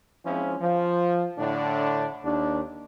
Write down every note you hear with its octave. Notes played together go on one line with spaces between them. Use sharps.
F3 G#3 C4 C#4 E4 F4
F3
A2 D3 D4
D#2 D4